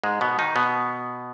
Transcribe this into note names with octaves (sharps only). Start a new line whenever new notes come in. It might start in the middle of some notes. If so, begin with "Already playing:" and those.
G#2 G#3
B2 B3
D#3 D#4
B2 B3